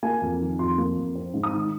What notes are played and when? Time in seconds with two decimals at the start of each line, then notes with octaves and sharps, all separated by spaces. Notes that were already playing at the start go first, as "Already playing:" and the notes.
0.03 A#3 G#5
0.22 F2
0.40 D#3
0.59 F2 C6
0.78 A#3
0.97 F2
1.15 C4
1.34 G#2
1.43 D#6
1.53 D#3